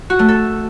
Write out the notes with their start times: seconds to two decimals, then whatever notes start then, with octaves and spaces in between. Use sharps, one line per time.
0.10 F#4
0.19 A3
0.29 A4